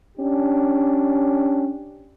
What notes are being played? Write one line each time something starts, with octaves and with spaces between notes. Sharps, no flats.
C#4 D4 G4